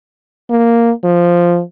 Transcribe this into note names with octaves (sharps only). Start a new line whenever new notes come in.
A#3
F3